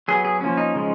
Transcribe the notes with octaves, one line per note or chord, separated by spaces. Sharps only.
F#3 B3 G#4
G#4
F3 A#3 C#4
D#4
C#3 F3 G#3